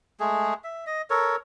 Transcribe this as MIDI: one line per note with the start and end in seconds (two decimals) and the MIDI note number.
0.20 0.54 56
0.20 0.54 57
0.20 0.54 68
0.64 0.85 76
0.86 1.02 75
1.10 1.36 69
1.10 1.36 70
1.10 1.36 73